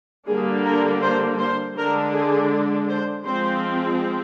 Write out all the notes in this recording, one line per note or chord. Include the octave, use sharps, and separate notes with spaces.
D3 G3 A#3 D4 G#4
A#4
C5
C5
D3 G#3 D4 A#4
G#4
C5
F3 G#3 C4 C5